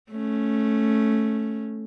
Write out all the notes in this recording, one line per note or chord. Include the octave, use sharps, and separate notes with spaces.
A3 C#4